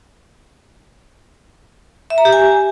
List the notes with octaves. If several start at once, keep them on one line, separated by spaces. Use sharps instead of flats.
E5
A#5
G4
G#5